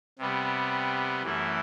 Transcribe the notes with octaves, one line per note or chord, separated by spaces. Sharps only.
C3 G3 B3
F#2 E3 A3 E4